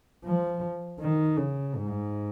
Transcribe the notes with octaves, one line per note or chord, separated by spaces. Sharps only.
F3
D#3
C#3
G#2